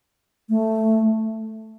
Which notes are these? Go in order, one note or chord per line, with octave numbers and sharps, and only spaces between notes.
A3